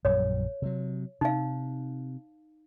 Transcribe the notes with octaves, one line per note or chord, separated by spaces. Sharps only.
A#1 F#2 G3 C#5
C3 F#3
C3 D#4 F5